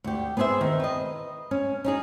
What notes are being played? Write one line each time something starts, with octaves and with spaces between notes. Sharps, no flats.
D2 G4
B3 C4 G#4 C5 E5
D#3
B4 D#5
C#4
C#4 D#4 G#4